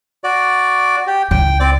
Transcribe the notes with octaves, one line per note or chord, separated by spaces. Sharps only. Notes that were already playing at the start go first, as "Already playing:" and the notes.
F#4 D5
G4
C#2 E4 G5
C4 D5 D6